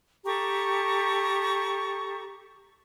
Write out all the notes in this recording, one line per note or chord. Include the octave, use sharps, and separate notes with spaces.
G4 A4 A#5 C#6